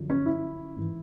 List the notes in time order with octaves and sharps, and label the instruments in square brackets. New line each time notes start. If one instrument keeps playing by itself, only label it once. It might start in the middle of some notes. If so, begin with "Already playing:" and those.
Already playing: [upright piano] F#2 D3 F3
C#4
E4
G#2 E3